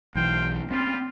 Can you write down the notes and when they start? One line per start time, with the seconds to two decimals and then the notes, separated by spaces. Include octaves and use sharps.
0.15 B1 E3 C5 F5 G5
0.71 G3 C4 C#4 F4